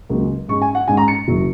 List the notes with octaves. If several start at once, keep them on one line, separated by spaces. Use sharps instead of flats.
C#2 C#3 F#3 A#3
G#2 G#3 C#4 C#6
G#5
F#5
G#2 G#3 C#4 G#5
A#5
C#7
F#1 F#3